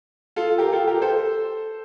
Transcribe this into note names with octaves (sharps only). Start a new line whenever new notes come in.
F4 A4
G4 A#4
F4 A4
G4 A#4
A4 C5